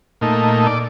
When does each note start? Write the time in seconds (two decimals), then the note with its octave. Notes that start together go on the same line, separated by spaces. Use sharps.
0.21 A#2 A3 D#4
0.67 D5